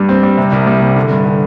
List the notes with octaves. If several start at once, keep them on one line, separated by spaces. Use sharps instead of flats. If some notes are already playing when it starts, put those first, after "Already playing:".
Already playing: G2 G3
C4
G3
C3
C2
G3
C3
D3
G2
D3